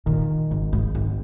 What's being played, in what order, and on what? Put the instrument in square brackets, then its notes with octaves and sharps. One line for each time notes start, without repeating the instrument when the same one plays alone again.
[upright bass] A#2 [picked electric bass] D#3
[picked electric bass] G#1 [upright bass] C#3
[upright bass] G#2
[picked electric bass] G#1 [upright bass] G#2